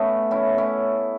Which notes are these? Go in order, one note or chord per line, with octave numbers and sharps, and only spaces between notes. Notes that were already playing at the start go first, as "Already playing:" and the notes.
Already playing: A3 B3 C#4
C#4 E4
C#4 E4